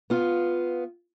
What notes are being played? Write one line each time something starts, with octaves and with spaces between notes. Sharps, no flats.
B3 F4 F5